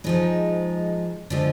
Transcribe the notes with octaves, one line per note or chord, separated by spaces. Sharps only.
G#2 F3 G#3 D#4
D3 F3 G#3